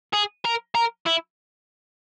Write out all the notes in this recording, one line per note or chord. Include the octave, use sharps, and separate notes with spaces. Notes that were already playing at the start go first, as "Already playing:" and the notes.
G#4
A#4
A#4
E4